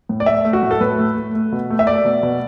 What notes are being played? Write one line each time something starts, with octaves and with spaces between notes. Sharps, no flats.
A2
D5
A3 E5
A3
F#4
A2
A4
A2 B4
A3
A3
A3
B2
A3
E5
A3 D5
B2
B2